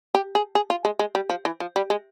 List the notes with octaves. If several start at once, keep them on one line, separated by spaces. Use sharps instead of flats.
G4
G#4
G#4
F4
G#3
G#3
G3
F3
E3
F3
G3
G#3